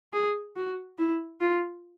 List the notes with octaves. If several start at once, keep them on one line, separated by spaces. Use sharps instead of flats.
G#4
F#4
E4
F4